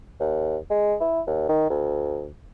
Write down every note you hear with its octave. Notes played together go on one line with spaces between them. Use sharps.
D#2
G#3
E4
D#2
D#3
D2